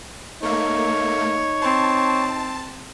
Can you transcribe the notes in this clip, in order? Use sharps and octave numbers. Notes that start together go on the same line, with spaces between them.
A3 A#3 D#4 C#5
C4 A5